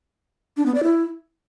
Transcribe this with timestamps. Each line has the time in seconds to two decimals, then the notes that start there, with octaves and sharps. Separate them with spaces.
0.57 D4
0.66 B3
0.75 D5
0.83 E4